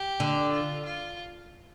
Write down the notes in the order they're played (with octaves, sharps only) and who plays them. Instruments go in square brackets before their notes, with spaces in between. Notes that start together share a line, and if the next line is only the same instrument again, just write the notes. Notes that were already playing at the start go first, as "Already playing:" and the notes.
Already playing: [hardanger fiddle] G4
[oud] D3
[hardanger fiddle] F4
F4